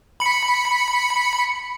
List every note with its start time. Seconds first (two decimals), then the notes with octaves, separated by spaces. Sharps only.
0.20 B5 C#7